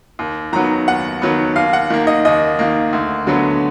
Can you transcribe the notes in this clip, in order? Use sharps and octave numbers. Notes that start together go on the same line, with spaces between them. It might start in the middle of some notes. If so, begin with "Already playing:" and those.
D#2
D#3 F#3 B3 A#5
D#2 F#5
D#3 F#3 B3
D#2 F5
F#5
D#3 A#3
D#5
D#2 D#5
D#3 A#3
D2
D3 F#3 B3